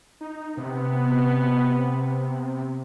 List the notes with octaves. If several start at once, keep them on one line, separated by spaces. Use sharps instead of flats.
D#4
C3 B3